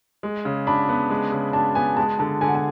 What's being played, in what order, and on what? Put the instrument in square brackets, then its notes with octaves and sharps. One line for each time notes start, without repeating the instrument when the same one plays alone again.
[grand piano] G#3
C#3
[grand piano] D4 [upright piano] B5
[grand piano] B3
G#3
C#3
[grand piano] D4 [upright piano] A5
[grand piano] B3 [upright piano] G#5
[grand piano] G#3 [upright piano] A5
[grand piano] D3 [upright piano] A5
[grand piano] D3 [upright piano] G#5
[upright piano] F#5
G#5